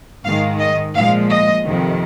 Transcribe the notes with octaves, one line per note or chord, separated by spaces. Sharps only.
G#2 D#3 G#3 F5
D#5
A#2 F3 G#3 F5
D#5
F2 C3 D#3